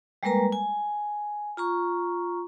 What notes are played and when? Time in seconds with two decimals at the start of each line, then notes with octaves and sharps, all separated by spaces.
0.23 G3 G#3 A#3 A#4 B4 A#5
0.52 G#5
1.57 F4 A#5 C#6